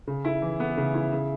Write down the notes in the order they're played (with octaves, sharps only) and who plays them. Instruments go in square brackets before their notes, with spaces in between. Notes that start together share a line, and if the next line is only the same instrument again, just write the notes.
[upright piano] C#3
E4
E3
B3
C#3
E4
C#3